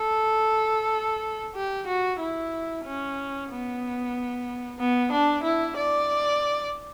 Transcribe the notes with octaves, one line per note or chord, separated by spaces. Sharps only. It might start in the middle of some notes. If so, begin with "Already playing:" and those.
Already playing: A4
G4
F#4
E4
C#4
B3
B3
D4
E4
D5